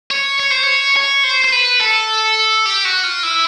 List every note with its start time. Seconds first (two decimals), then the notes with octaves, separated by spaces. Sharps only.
0.11 C#5
0.40 C#5
0.51 C5
0.64 C#5
0.97 C#5
1.24 C5
1.44 C5
1.52 B4
1.81 A4
2.66 G4
2.85 F#4
3.04 F4
3.23 E4